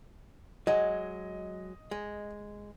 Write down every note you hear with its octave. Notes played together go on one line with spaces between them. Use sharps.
F#3 G#3 D#5
G#3